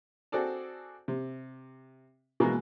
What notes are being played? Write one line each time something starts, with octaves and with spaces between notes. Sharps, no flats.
C4 F#4 G#4 A4 D5 A5
C3
B2 E3 G#3 A#3 G#4